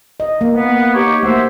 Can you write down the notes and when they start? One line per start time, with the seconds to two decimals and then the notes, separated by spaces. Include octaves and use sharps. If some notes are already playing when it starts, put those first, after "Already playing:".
0.20 D#5
0.41 A#3
0.54 B3
0.94 D#4 G4 C#5
1.23 A3 A#3 F#4 C5 E5